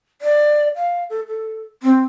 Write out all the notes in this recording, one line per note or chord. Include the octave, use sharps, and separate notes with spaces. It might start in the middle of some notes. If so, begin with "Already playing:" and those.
D5
F5
A4
A4
C4